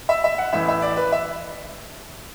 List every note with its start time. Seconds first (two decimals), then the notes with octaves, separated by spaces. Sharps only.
0.09 E5
0.24 E5
0.38 F#5
0.53 A1 A2 E3 E5
0.68 E5
0.82 D5
0.97 B4
1.12 E5